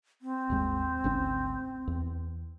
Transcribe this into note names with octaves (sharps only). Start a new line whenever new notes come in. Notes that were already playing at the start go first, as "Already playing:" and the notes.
C4
G#1 D#2 G#3
G#1 D2 C#4
E2